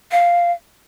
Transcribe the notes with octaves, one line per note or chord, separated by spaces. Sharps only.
F5